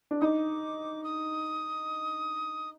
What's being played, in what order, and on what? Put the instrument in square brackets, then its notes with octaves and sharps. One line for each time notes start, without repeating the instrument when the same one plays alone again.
[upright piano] D4
[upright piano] D#4 [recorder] D6 D#6
[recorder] D#6